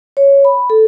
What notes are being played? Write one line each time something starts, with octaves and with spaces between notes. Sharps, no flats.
C#5
B5
A4